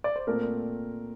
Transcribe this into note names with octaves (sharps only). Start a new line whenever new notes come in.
D5
C5
A#2 A3 C4 A#4